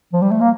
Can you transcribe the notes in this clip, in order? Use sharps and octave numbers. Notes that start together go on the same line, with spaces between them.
F3
G3
A3
A#3